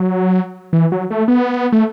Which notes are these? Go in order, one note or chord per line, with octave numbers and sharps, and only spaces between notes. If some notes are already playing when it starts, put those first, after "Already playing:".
Already playing: F#3
E3
F#3
A3
B3
A3